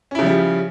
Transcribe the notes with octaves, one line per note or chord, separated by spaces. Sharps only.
C#3 F3 G3 C#4 E4